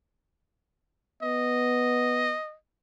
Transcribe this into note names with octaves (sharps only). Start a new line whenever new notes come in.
B3 D#5